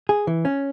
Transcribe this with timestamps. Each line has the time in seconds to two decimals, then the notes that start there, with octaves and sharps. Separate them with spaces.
0.09 G#4
0.27 E3
0.45 C#4